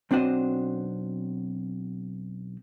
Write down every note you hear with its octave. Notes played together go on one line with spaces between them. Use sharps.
B1 C4 D4 F#4 C5 D#5